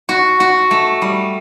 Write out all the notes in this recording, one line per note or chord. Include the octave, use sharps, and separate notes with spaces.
F#4
F#4
A3
G3